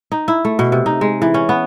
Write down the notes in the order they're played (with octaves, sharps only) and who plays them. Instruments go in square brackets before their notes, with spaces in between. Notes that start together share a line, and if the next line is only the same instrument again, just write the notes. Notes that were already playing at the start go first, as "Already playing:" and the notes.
[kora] D#4
E4
A3
B2
C3
D#4
G#3
E3
C#4
B3